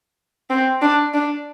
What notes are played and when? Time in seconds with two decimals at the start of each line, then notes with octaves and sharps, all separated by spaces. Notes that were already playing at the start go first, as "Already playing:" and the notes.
0.50 C4
0.82 D4
1.14 D4